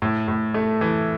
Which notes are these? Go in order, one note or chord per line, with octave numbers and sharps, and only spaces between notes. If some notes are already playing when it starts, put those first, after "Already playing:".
A2
A2
A3
E3